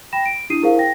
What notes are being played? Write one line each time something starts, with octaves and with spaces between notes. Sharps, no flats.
G5 B5 A#6 E7
D7
D4 E4 G4 D#6 C7 D#7
E4 G#4 A#4 C5 F5
G5 A#6